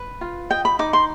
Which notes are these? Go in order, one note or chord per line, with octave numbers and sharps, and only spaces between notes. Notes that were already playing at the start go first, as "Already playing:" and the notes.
Already playing: B4
F4
D#5 G5
B5
D#4 D6
C6